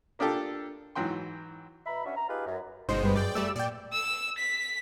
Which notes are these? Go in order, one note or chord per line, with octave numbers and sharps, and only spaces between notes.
A#3 D4 F4 G4 A4
G#2 E3 F#3 G5 C6
B2 E5 A#5 B5
C#4 D4 F#4 E5
A#5
D#4 F4 G4 G#4 B4
F#2
G1 B2 G#3 D4 D#4 C5
G2 B4
F#2 G#4 D5 F5 G5
G3 A3 D5 E6
A#2 D5 G5
E6
B6